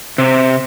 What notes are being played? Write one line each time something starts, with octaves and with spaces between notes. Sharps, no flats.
C3